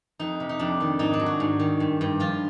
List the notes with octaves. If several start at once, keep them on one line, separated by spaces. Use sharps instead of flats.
F2 D#4
C3
D#4
F2 D4
D#3
G#2 D#4
D4
F#3
F#4
G#2
D#3
G2
G2
F3 F4